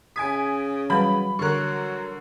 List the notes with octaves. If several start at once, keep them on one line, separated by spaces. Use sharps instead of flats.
C#3 G#5 D#6 G#6 B6 D7
E3 F#3 G3 B4 B5
D3 F#3 A#4 C#6 F#6